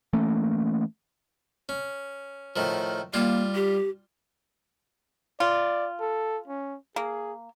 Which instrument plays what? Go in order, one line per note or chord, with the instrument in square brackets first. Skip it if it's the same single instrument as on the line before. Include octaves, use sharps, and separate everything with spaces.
[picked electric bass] E3 A3 A#3 C#4
[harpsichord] C#4
A2 D#3 F3
[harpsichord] G3 F4 [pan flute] A#3
[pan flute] G4
[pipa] F4 [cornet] D5
[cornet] A4
C#4
[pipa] A#3 [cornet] G#4